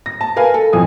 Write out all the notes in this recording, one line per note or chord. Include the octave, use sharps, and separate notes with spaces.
A#6
A5
A#4 B4 F5 G#5
A4
A1 F2 G#5 D#6